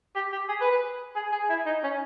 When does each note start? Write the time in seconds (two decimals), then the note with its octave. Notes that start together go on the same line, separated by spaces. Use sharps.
0.15 G4
0.32 G4
0.49 G#4
0.61 B4
0.71 B4
1.15 G#4
1.32 G#4
1.49 E4
1.66 D#4
1.83 C#4